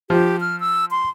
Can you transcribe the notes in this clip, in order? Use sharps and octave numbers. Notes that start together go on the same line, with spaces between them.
F3 G4
F6
E6
C6